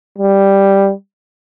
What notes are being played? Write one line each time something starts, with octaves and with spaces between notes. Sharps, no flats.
G3